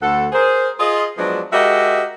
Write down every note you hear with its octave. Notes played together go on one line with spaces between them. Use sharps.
D2 A4 F#5
G#4 A#4 C5
F4 G#4 D#5
F3 F#3 G#3 B3 D4
G#3 F#4 G4 A#4 D#5 E5